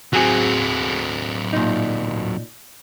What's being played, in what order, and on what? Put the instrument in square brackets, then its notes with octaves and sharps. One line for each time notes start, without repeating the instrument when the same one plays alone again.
[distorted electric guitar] F#3 C4 [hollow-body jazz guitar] F#4 G#4
[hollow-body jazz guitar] A#2 D#4